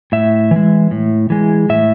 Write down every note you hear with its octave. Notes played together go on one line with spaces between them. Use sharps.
A2 E5
E3 G#3
A2
E3 G#3
A2 E5